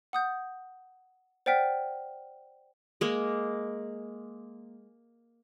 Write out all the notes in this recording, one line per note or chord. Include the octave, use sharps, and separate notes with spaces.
F#5 D#6 G6
C5 D5 F#5 G5 F6 B6
G#3 A#3